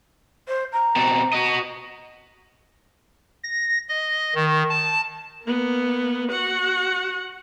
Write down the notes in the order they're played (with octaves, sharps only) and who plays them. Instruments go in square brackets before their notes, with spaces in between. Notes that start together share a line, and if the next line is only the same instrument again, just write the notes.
[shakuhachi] C5
A#5
[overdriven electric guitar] B2 C4
F#4 D#5
[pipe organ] A#6
D#5
D#3
A5
[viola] A#3 B3
F#4 F#5